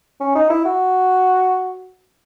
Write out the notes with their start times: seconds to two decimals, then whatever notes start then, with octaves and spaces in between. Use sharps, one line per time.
0.20 C#4
0.35 D#4
0.50 E4
0.65 F#4